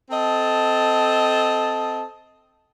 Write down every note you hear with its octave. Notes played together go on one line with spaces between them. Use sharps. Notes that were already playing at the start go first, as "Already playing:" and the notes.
C4 A4 D#5 A5